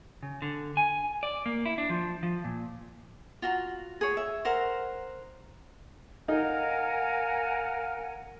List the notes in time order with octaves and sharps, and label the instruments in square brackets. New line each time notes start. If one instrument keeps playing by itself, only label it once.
[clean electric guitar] C#3
D3
G#5
D5
A#3
E4
D4
F3
F3
A#2
[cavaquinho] F4 F#4 A#5
G#4 C#5
E5
A#4 C5 F#5 A#5
[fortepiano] D#4 [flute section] A#4 F#5 G#5 [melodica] F5